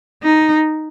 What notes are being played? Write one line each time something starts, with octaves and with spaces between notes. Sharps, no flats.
D#4